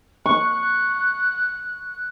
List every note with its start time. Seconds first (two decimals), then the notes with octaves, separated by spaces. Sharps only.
0.26 C#6 F#6